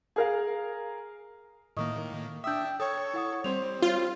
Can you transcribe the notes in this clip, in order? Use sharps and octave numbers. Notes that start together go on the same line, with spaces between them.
G#4 A#4 F5
A2 D#3 A#3 D#5 C#6 D#6
D4 E5 G5 D#6 E6 G6
A4 C#5 G5 C#6 D#6
E4 F#5 D#6
G3 C4 C5 F7
F4 C#5 G7